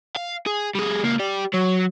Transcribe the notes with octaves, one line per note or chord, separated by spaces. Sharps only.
F5
G#4
G3 G#4
C#2 A#3
G4 D5
F#3